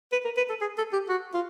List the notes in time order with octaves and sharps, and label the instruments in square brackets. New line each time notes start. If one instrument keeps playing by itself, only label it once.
[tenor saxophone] B4
A#4
B4
A4
G#4
A4
G4
F#4
F4